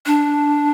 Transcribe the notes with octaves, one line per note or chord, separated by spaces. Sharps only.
D4